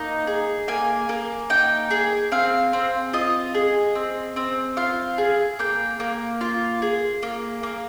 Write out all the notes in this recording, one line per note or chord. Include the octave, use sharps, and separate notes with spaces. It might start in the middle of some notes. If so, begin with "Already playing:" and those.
Already playing: A#3 D#4 D#5
G#4
A#3 G#5
A#3
D#4 G5
G#4
C4 F5
C4
F4 D#5
G#4
C4
C4
F4 F5
G#4
A#3 G5
A#3
F4
G#4
A#3
A#3